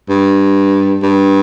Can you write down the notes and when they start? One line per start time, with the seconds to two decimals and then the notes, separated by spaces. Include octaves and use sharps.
0.09 G2
1.03 G2